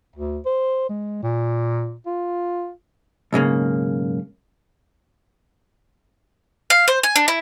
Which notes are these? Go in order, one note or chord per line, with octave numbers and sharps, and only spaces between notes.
D2
C5
G#3
A#2
F4
B1 G#2 C#3 A#3
F5
C5
G#5
D4
E4